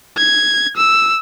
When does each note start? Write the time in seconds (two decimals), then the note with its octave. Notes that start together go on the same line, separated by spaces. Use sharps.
0.17 G#6
0.77 E6